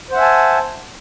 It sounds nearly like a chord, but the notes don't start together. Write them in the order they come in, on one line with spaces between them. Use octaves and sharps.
C5 F#5 E5 G#5 A5